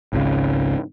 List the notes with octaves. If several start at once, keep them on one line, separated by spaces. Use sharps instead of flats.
G#1 C#2 C#3